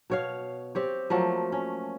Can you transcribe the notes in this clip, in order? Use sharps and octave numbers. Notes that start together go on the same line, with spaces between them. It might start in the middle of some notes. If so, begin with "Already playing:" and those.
B2 C#5 F5
C4 G4 C#5
F3 F#3 A3 A#3
C#4